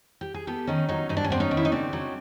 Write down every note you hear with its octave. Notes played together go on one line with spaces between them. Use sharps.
G4
G#4
B3 G4 A4
D#3 C#4 D#4
F#3 C#4 D#4
G2 D#4
D4
C#4
B3 C4 D4
C#4 D#4
D#3
E4
D#4
C#3 C4 D4
F#3